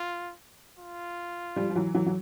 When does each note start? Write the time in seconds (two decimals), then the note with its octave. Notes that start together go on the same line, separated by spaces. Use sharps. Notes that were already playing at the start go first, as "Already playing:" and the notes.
Already playing: F4
0.79 F4
1.56 F3 G3
1.70 F3
1.75 E3 F#3
1.94 E3 F#3
2.06 F#3